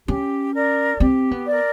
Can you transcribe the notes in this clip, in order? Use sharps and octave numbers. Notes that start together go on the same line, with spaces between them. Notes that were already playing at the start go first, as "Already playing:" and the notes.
C#4 G4
A#4 D5
C4 G4
B3
A#4 D5